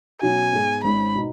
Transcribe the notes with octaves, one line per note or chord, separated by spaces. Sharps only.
B2 F#3 C#4 F#4 G#5
G#2 G#3 B3 G#4
G#1 G#2 G#3 C#4 B5
B2 B3 D#4